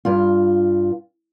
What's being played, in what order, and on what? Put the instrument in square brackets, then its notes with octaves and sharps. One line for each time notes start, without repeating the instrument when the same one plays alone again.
[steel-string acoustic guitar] G2 F4